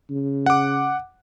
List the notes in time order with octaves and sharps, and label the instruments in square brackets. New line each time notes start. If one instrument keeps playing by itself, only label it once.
[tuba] C#3
[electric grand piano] F#5 D6